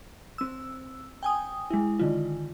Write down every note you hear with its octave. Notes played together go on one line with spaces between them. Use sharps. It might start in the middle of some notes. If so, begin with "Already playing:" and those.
C4 E6
G5 G#5 D#6
G#3 E4
D3 D#3 F4